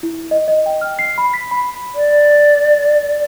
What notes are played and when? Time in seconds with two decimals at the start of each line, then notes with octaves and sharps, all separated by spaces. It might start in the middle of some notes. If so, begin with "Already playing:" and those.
0.03 E4
0.31 D#5
0.48 D#5
0.66 G5
0.81 F6
0.99 C7
1.18 B5
1.34 B6
1.51 B5
1.95 D5